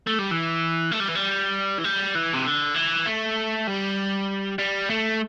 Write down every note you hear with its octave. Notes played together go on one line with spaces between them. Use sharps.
A3
G3
E3
A3
G3
E3
G3
E3
G3
E3
C3
D3
E3
A3
G3
G3
A3